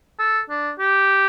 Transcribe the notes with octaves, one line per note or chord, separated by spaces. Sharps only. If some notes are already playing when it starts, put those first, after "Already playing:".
A4
D4
G4